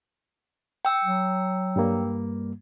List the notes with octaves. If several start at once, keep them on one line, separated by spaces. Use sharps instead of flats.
G5 E6
F#3
G2 G3 A#3